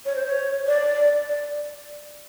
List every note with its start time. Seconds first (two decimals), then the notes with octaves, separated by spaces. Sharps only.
0.06 C#5
0.16 C5
0.26 C#5
0.67 D5
1.28 D5